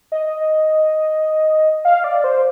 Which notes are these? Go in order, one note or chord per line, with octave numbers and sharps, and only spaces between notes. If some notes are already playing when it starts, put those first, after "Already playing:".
D#5
F5
D5
C5